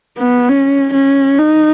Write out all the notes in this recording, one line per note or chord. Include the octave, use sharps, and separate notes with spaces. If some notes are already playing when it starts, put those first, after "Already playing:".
B3
C#4
C#4
D#4